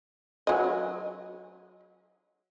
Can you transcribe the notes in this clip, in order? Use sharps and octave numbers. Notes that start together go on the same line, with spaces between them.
F#3 D#5